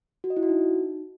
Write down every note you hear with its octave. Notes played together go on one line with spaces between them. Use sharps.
F#4
D#5
E4
F#4
D#4